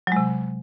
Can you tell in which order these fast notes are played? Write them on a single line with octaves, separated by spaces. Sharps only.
F#3 G#3 C3